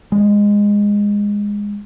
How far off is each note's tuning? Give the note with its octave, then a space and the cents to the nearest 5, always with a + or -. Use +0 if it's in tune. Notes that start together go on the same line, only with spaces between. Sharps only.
G#3 -15